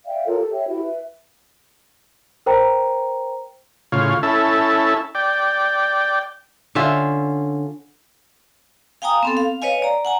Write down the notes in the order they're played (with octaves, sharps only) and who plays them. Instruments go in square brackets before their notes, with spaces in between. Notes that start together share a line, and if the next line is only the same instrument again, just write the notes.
[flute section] D5 E5 F5 G5
F4 A4 A#4 C#5
G4 A4
C#5 E5 G5
E4 F#4 G4 A4
B4 E5
[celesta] A#4 C5 G5 A#5
[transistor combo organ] A2 C#3 F4 C#5 F5
C#4 E4 A4 E5 A5
D5 G5
[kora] D3 C#4 F4 E5
[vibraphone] F5 G5 G#5 A#5 D#6
B3 C4 A4
F5
B4 C#5 D#5 F5 G#5
D5 A#5
F#5 G#5 A#5